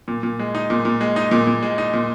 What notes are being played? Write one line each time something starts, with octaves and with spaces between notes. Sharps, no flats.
A#2
A#2
G#3
D#4
A#2
A#2
G#3
D#4
A#2
A#2
G#3
D#4
A#2